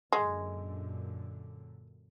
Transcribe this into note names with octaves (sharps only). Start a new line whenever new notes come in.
F#2 A#2 D3 G#3